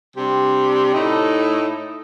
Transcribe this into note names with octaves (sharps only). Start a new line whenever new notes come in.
C3 G3 D4 G4
A2 A3 D#4 A4